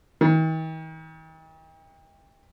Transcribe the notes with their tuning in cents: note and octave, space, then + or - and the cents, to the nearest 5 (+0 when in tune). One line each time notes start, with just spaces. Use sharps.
D#3 +45